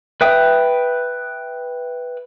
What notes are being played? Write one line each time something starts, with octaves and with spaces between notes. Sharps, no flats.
B4 E5 G5 D#6